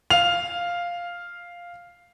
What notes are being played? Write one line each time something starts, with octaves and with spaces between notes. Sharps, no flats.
F5 F7